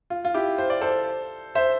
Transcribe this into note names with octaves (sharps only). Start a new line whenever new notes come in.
F4
F4
E4 G4
C5
D5
A4 C5
C5 E5